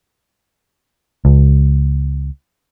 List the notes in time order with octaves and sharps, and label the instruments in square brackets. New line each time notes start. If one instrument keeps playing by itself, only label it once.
[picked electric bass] C#2